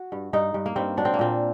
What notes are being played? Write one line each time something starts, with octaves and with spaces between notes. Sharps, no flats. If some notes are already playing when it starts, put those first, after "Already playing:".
Already playing: F#4
G2
G2 D#4
G2
A#3
G2 C4
F#3 D4
C4
A#3
A#2 C4